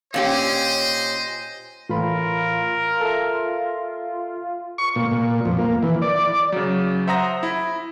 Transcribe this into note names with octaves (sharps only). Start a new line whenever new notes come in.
A#2 C#4 G4 C5 D#5
A2 E3 F4 A#4 B5
A4 E5
C#6
A#2
A#2
F2
A#3
E3
D5
C#3 F#3
C5 E5 F#5 A#5 D#6 A#6
E4